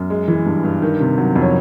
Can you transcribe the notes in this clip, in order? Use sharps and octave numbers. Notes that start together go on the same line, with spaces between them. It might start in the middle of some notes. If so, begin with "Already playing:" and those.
Already playing: F#2
G#3
E3
G2
G2
D#3
C3
F#3
F2
C#5